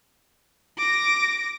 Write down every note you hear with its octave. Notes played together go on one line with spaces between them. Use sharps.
D6 A#6